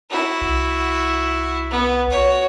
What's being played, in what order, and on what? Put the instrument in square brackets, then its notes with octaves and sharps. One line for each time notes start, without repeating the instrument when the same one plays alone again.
[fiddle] E4 F#4
[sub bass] C2
[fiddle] B3
F#4 C#5